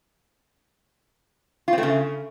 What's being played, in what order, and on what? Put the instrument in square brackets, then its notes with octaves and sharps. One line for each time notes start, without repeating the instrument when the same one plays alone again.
[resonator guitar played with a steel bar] F4
C4
A3
C#3